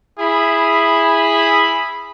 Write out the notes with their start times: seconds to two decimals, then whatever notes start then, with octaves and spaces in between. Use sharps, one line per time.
0.19 E4 G#4 B5